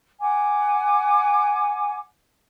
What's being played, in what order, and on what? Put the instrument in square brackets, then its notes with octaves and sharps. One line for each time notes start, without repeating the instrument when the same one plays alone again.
[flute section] F#5 G#5 D6